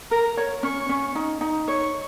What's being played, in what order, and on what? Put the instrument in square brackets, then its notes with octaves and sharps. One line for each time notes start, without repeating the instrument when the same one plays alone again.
[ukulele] A#4 [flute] A#5
[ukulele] C#5
[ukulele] C#4 [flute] C#6
[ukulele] C#4
D#4
D#4
[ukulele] C#5 [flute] C#6